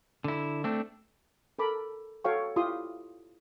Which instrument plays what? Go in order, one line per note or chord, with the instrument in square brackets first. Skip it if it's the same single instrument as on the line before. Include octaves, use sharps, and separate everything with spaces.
[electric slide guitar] D3 E4
A3 C4 D4
[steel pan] A4 A#4 B5 D6
F#4 A4 C#5 F5 G5 C#6
E4 F4 G4 C6 D#6